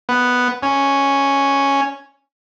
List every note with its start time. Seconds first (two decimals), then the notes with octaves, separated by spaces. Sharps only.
0.09 B3
0.63 C#4